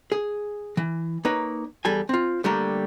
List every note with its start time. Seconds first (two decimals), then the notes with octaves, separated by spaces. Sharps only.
0.12 G#4
0.77 E3
1.25 A#3 D#4 B4 C#5
1.85 E2 G3 A4 G#5
2.09 C4 F4
2.44 D3 G3 A3 A#3